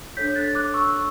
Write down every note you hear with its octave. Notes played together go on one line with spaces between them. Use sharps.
D4 A4 C#5 G6 B6
F#6 A6
D6 F#6
C#6 E6